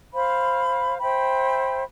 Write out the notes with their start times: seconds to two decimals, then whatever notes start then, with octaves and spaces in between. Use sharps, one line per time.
0.13 C5 F5 B5
0.99 C5 E5 G5 B5